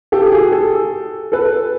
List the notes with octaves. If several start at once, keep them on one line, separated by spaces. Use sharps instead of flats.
G4 A4
F#4 G#4
G4 A4
A4 B4